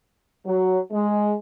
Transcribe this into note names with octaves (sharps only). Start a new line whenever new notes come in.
F#3
G#3